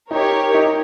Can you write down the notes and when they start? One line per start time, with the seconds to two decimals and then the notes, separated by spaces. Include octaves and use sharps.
0.11 D#4 G4 A#4 C#5
0.54 D#4